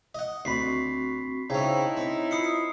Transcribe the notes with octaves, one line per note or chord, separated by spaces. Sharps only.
D#5 F#5
D2 C4 F#4 B5 C#6 B6 C7
C#3 C#4 D#4 E4 C5 G5 A5
C4 C#5
F4 B5 D#6 C7 C#7